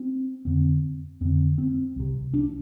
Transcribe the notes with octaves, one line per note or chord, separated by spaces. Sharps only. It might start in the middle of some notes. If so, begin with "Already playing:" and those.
Already playing: C4
F2 D3 C4
F2 D3 C4
C4
C2 C3
D4